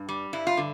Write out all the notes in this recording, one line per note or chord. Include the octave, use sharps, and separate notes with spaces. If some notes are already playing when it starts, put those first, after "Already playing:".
Already playing: G2
G3
G2 E4
F4
D3